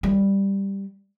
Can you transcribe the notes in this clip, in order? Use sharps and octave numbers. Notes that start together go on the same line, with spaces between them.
G3